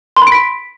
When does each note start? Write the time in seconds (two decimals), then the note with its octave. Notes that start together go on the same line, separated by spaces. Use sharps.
0.17 C6
0.22 B5
0.27 D7
0.32 B6